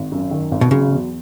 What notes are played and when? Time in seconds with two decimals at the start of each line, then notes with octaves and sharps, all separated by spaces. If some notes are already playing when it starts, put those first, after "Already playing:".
Already playing: G#1
0.12 F#2
0.31 D#3
0.51 G#1
0.61 B2
0.71 C#3 F#3
0.91 E2